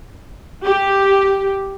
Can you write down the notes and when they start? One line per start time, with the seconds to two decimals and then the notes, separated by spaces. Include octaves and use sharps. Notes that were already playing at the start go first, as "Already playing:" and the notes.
0.65 G4